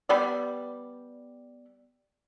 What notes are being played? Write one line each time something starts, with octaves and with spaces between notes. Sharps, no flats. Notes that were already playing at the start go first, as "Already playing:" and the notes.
G3 B3 G4 D5